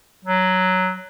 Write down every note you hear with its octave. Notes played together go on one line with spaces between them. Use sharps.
F#3